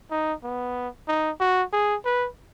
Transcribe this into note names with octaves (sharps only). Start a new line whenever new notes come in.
D#4
B3
D#4
F#4
G#4
B4